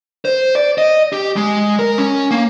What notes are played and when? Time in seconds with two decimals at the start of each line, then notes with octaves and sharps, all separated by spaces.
0.25 C5
0.55 D5
0.78 D#5
1.13 G4
1.36 G#3
1.79 A#4
1.98 C#4
2.31 A#3